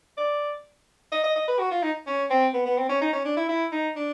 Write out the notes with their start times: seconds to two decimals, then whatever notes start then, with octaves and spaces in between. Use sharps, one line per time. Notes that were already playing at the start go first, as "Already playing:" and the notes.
0.17 D5
1.12 D#5
1.24 D#5
1.36 D#5
1.48 B4
1.59 F#4
1.71 F4
1.83 D#4
2.07 C#4
2.30 C4
2.54 B3
2.66 B3
2.77 C4
2.89 C#4
3.01 D#4
3.13 C#4
3.25 D4
3.37 E4
3.49 E4
3.72 D#4
3.96 D4